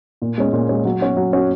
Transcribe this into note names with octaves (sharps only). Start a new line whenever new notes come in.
A#2
G#3 C#4
A#2
G#3 C#4
F#3
C#4 F#4
F#3
C#4 F#4